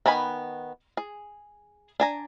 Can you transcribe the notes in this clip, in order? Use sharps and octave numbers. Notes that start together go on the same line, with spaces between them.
D#3 B3 G#5 B5
G#4
D4 G#5 A#5